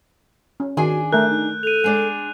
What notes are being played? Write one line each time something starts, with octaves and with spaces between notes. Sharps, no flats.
C#4
D#3 D4 F#4 G#4 G#5
A3 A#4 E5 F#6 G6
D#4
A4 D#7 F7
G#3 D4 D5